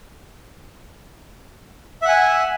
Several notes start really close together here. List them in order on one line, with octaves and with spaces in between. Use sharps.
E5 F#5 G#5